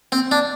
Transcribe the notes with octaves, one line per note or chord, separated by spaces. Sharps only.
C4
D4